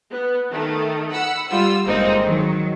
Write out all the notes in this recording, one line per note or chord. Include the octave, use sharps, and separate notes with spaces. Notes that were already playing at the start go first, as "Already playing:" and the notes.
B3
D#3 A3
F#5 B5 E6
G3 F4 E6
G1 G#3 A#3 C4 D#4
D#3 F#3